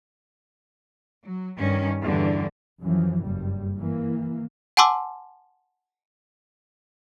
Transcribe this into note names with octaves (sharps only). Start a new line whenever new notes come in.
F#3
G2 D#3 C#4
E2 G2 D3 E3
F#2 E3 F3
F#1 G2 G3
E3 A#3
F#5 G#5 A5 C6 D6 E6